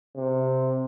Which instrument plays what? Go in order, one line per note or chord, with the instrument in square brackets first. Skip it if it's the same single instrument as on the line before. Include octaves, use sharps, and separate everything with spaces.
[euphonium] C3